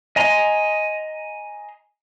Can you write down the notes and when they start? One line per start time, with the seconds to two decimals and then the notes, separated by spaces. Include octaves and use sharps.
0.16 D#5 G#5 A#5 C6